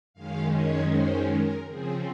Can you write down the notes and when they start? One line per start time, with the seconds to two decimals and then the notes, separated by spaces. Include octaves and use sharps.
0.13 F#2 D#3 G#3 C#4 F5
0.52 C#5
0.89 C5
1.27 A#4
1.65 C#3 F3 C4 G#4